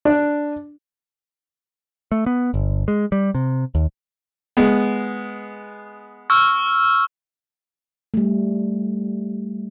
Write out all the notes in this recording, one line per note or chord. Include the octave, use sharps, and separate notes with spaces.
D4
A3
B3
G1
G#3
G3
C3
D#2
G#3 B3
C#6 E6 F6
G3 A3